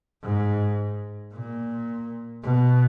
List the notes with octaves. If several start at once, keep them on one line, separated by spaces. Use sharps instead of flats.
G#2
A#2
B2